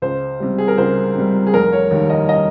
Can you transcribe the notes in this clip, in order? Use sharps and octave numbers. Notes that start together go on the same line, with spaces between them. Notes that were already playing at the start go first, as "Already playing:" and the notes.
C#2 C5
C3 G3
G#4
A#4
C#2 C5
C3 G3
G#4
F1 A#4
C#5
D#2 D#3 G3
D#5
D#5